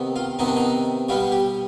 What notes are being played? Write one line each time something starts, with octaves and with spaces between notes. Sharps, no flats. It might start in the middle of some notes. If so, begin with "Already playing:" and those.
Already playing: C3 D#3 B3
F4
C3 D#3 B3 D#4
D4
D#4
B2 G3 B3 F4
G4